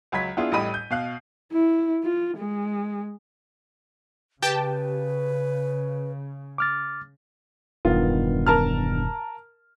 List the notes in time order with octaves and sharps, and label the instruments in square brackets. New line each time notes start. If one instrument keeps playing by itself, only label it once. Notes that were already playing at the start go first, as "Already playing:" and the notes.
[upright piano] C#2 F#3 B5 G#6 B6
B3 D4 E4 F4 G#4
A1 A2 G3 D#5 B5 D#7
G6
B2 F5 F#6
[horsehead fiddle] E4
F4
G#3
[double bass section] C#3 [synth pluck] G4 G5 A5 [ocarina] B4
[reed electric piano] D6 F6 A6
[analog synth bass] E1 [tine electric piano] G2 D#3 B3 [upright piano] F4
[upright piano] A#4 A5 F6